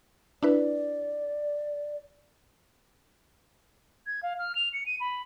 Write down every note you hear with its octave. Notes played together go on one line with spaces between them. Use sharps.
D4 E4 B4 D5
G#6
F5
F6
F7
C#7
D#7
B5